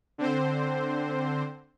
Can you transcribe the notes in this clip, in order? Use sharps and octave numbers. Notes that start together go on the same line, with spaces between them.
D3 C4 C5